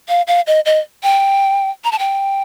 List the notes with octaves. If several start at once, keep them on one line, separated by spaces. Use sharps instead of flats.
F5
F5
D#5
D#5
G5
A#5
A5
G5